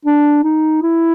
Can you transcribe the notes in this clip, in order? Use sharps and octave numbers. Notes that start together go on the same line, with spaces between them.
D4
D#4
E4